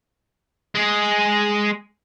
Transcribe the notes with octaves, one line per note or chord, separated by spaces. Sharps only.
G#3 G#4